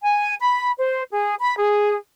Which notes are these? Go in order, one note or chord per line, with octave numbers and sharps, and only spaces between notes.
G#5
B5
C5
G#4
B5
G#4